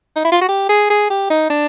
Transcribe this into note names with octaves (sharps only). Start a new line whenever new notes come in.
D#4
E4
F4
F#4
G4
G#4
G#4
G4
D#4
D4